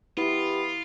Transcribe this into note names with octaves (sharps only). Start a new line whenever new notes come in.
B3 E4 F4 G4